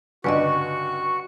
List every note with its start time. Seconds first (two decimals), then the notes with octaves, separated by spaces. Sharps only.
0.24 C#2 G2 D3 F#4 B4 D5 D#5 C#6